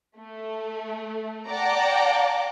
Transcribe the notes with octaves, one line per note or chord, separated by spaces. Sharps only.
A3
D5 F#5 G5 A5 A#5 D6